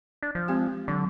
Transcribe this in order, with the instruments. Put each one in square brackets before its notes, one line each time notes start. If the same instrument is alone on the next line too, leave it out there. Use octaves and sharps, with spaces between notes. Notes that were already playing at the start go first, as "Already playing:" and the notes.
[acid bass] D4
F3
[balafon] G#3 C4 G4
[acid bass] D3 [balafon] F#3